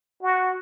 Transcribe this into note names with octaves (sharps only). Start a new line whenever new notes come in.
F#4